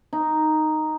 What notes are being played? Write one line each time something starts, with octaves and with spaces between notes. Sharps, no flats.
D#4